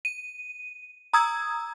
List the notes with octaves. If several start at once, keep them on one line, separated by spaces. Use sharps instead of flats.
D#7
A#5 D#6 E6 G#6